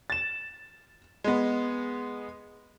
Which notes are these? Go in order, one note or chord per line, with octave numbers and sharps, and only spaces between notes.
A6 E7
G#3 B3